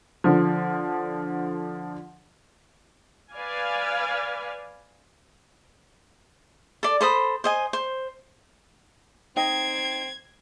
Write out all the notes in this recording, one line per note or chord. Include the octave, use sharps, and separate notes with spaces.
D3 F3
B4 D5 F5 G#5
A4 D5
A4 C5 B5 D#6
C5 D#5 G#5
C5
C4 D#4 D#5 G5 G#6